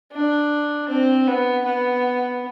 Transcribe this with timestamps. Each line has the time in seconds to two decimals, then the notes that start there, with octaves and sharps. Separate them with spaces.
0.12 D4
0.89 C4
1.27 B3
1.65 B3